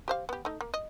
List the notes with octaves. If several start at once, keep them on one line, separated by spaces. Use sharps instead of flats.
G4 C5 F5
B3 G4
A3 D#4
A#3
D#5